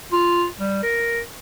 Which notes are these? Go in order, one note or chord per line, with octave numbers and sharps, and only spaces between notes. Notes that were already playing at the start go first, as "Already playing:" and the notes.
F4
G3
A#4